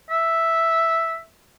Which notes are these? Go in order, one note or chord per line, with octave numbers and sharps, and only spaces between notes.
E5